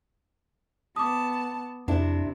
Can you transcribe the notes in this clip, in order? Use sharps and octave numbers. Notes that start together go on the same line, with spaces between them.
B3 A5 D6 D#6
F2 C3 D4 E4